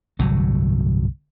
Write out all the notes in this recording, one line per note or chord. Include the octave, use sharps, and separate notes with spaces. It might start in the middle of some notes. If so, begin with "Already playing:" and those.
G1 C2 A2 F#3